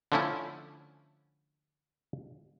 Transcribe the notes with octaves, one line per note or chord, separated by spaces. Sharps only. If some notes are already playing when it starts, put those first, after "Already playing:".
D3 F3 A3 C#4 E4